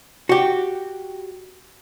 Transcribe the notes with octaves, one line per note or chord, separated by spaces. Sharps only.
F#4 G4